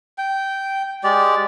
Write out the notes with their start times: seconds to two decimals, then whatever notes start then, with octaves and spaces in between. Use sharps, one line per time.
0.18 G5
1.04 G#3 G4 D5